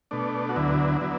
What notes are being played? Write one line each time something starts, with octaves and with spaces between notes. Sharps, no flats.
B2 A3 D4
F#4
D2 D3 F#3 B3 E4
D3 F#3 B3